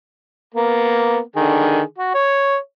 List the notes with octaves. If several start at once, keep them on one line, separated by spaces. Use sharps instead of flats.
A#3 B3
D3 D#3 G#4
F#4
C#5